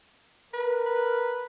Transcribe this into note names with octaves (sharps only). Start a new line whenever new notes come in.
A#4 B4
B4